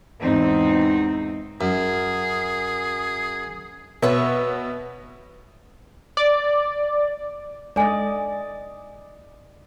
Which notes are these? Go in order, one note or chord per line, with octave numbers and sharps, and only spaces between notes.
E2 G#2 C4 D#4
F#2 G#4
B2 B4 C#5 E5
D5
G#3 D4 A4 D5 D#5 G#5